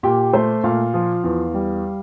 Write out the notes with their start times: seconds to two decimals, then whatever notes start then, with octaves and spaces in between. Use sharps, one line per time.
0.03 A#2 G4
0.33 A3 C5
0.64 A#2 F5
0.94 F3
1.24 E2
1.54 G3